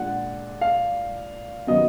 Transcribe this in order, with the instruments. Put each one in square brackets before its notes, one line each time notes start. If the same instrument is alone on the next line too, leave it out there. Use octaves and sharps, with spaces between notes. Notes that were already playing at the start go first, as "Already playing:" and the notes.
Already playing: [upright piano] A#2 G#3 D4 [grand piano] F#5
[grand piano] F5
[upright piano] D#3 F#3 B3 [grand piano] D#5